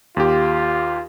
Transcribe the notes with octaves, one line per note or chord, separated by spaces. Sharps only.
D#2 F4 G4